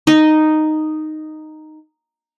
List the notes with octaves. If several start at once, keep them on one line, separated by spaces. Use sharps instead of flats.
D#4 D#5